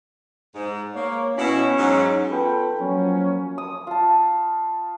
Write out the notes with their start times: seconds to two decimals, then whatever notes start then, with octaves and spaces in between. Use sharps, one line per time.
0.55 G#2
0.95 A#3 C#5
1.37 B2 C#4 E4
1.77 G#2 F#3
2.30 B3 F4 A4 B4 G5 B5
2.80 F3 F#3 A#3 C#4
3.58 D#6
3.87 F4 A5